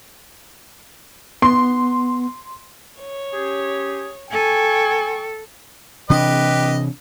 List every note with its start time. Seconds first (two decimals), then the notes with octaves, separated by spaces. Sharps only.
1.42 B3 C6
3.01 C#5
3.33 C#4 G4 G#4
4.31 A4 G5 G#5 C#6
6.10 C3 E3 D4 G4 B4 D#5